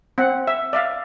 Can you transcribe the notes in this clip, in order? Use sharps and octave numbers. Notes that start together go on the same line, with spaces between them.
C4 F#5
E5
D5 E5 F5